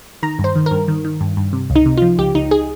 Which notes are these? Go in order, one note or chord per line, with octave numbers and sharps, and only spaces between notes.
D#3 A#5
G2
C5
D#3
A#4
G2
D#3
D#3
G2
G2
C3
C#2
D#4
C3
F4
F3
C#2 G4
C#2 D#4
G#4